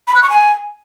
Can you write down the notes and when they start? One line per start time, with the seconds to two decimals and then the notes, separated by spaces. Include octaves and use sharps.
0.08 B5
0.15 F#6
0.22 C#6
0.30 G#5